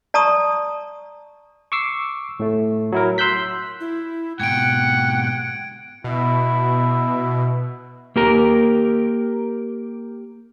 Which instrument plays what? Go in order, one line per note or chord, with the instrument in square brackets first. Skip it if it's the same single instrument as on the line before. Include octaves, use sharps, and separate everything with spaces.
[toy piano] D5 A5 A#5 C#6 D#6
[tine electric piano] C#6 D6 E6 C7
A2 A3
F#3 E4 A#4
C6 E6 F#6 G6 B6
[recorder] E4
[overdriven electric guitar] G#2 B2 [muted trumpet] F#5 [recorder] G5 [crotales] G#6 D7
[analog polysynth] B2 [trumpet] E4
[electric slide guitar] A#3 G4 A#4